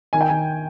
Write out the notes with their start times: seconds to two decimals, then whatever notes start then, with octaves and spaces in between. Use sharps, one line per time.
0.13 D#3 G#5
0.21 G5
0.28 D#3 G#5